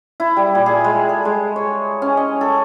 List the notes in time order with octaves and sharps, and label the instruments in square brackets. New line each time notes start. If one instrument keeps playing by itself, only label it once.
[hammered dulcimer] E4
G3
A#2
G#4
G#3
A4
G#3
C#5
C#4
D#5
A4